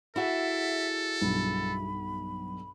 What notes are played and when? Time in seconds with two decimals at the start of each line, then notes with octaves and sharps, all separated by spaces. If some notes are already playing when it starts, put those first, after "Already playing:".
0.16 E4 F#4 G#4 A4 E5
1.22 B1 G2 B5